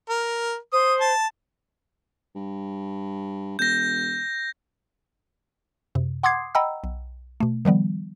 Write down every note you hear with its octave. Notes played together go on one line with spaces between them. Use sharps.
A#4
C5 D#6
A5
G2
E1 G6 A#6
F#2 C3
F#5 C6 D6 D#6 G#6 C7
D#5 F#5 G5 A#5 B5 E6
B1
B2 A3
D#3 F3 G3 B3